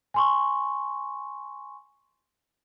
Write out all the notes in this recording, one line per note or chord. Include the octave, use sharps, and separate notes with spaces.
G#5 C6 C#6